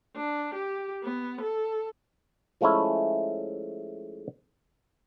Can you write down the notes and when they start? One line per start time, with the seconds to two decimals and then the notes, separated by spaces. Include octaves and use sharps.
0.16 D4
0.55 G4
1.04 B3
1.42 A4
2.61 F3 G#3 A3 C#4 E4